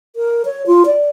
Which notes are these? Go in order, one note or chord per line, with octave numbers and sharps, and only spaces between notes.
A#4
C#5
F4
D5